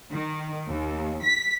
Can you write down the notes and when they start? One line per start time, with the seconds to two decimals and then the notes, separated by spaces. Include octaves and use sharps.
0.13 D#3
0.70 D#2
1.23 B6